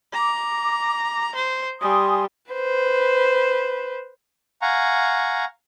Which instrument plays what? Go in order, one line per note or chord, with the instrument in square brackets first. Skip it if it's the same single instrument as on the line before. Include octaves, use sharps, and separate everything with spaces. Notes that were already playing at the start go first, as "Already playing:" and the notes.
[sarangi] A#5 [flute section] D6
[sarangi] C5
[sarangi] G3 [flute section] G#5 C6 D#6
[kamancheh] B4 C5
[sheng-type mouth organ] F5 F#5 G#5 A#5 C#6